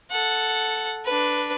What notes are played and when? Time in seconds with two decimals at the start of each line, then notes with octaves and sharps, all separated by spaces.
0.11 A4 F#5
1.05 D4 B4